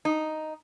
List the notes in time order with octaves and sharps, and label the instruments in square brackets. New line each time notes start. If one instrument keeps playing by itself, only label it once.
[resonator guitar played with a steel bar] D#4